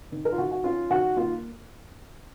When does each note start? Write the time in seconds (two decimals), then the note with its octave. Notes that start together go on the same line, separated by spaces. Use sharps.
0.12 D#3
0.25 A#4
0.32 F4
0.38 D#3 F#4
0.51 F#4
0.64 C#4 F4
0.90 D#3 F#4
1.17 A#3 F4